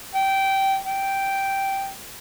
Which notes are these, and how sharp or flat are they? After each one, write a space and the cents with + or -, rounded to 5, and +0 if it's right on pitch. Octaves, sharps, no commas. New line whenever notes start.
G5 -15
G5 -5